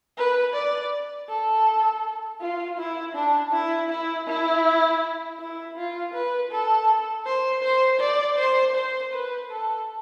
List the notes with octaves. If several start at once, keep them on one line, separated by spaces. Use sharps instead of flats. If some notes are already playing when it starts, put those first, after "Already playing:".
B4
D5
A4
F4
E4
D4
E4
E4
E4
E4
F4
B4
A4
C5
C5
D5
C5
C5
B4
A4